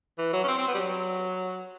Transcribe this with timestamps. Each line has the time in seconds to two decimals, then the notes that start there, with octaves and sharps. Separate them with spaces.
0.18 E3
0.33 F#3
0.44 C#4
0.48 C4
0.58 C4
0.68 B3
0.74 G3
0.77 F#3